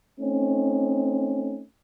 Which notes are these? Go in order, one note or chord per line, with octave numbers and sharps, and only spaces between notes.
A3 C4 C#4 D#4